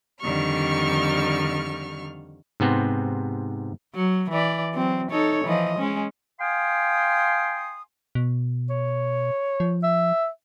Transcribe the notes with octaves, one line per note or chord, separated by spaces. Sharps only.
F2 D3 D#3 G3 C#6 F6
G#2 C3 B3 C4
F#3
E3 D5
F#3 C4
D#4 A4 C#5
E3 F3 D#5
G#3 C#4
F5 G5 G#5 C6 D#6
B2
C#5
F3
E5